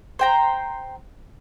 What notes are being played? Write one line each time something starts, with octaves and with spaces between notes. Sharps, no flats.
C5 G5 A#5